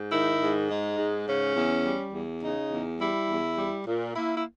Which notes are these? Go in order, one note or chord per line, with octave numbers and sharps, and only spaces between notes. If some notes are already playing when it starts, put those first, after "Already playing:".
Already playing: G#2
D#3 E4
G#2
G#3 D#4
G#2
C#3 C#4
E2
G3
E2
C#3 D#4
E2
G3 E4
E2
G3
A#2
A#3 E4
E4